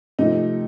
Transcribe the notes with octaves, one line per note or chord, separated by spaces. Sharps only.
C3 F3 A3 D#4